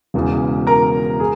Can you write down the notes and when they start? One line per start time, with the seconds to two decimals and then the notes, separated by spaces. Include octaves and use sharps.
0.14 E1 E2 C#3
0.67 A#4 A#5
1.20 G#4